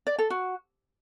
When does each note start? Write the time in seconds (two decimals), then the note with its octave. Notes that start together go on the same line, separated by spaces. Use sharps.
0.07 D5
0.18 A4
0.30 F#4